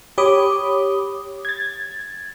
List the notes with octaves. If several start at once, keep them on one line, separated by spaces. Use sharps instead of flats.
G4 C#5 B5 D6 D#6
G#6 A6